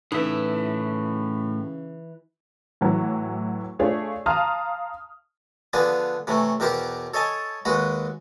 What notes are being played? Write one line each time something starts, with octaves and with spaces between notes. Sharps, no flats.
A2 C#3 E3 D#4 E5
A2 E3 F#3
A3 D4 F4 G#4 C#5
F5 A5 A#5 C6 D#6 F6
D3 F3 B3 D4 G#4 B4
C3 E3 A3 C#4
E2 B2 G4 A#4 C5 D6
A4 C#5 D#5 G#5 A5
D#2 G#3 F#4 B4